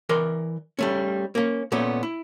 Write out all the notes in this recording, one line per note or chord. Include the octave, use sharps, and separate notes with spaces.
E3 A#4 D5 C6
G3 A3 C#4
A#3 C#4
A#2 A3 B3 C#4
E4